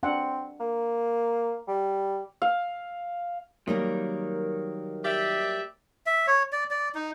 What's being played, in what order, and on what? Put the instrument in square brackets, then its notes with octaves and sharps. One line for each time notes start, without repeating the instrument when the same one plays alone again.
[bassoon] C4 [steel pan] D4 F#5
[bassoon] A#3
G3
[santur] F5
[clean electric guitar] D#3 [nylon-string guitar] F#3 G3 A#3
[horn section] G4 D5 E5
[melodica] E5
C#5
D5
D5
D#4